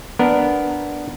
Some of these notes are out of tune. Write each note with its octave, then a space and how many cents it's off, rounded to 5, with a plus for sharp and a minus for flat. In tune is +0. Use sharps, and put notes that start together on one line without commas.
B3 +0 D4 +0 A#4 +0